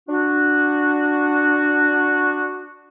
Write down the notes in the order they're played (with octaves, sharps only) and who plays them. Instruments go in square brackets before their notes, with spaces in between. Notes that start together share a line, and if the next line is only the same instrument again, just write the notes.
[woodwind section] D4 F#4